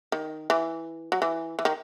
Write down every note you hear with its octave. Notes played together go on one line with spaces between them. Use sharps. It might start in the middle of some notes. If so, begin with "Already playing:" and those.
D#3
E3
F#3
E3
E3
D#3